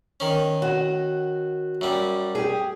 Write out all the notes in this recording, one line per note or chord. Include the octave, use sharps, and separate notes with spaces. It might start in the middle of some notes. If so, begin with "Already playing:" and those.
D#3 C#4
F#4
F#2 G3
G4 G#4